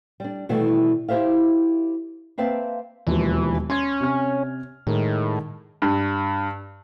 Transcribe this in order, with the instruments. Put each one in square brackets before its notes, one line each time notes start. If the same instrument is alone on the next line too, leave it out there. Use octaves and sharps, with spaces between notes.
[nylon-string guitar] G3 D4
B2 D#3 E3 G3 A3
E4 G4 G#4 C5 E5 F5
A#3 C4 B4 E5 F5 A5
[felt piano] E1 D#2 F3 [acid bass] E3
[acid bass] C#4 [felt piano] C6 G#6
[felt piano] C3 F6
[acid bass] A2 [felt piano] D#3 G#3
[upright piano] G2